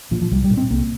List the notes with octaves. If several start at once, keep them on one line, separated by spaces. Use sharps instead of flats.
A#2 F3
F3
C2 G3
G3
A#2
C4
C2 A#3